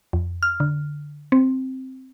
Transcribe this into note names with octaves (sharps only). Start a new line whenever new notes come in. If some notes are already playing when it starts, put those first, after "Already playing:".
F2
F6
D3
C4